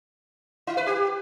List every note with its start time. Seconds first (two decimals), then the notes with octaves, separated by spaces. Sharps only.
0.67 E4
0.77 B4
0.87 G4